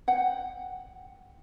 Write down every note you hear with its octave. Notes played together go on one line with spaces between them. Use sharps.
F#5 G5